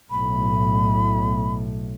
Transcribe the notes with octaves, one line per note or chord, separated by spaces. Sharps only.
B1 A2 B5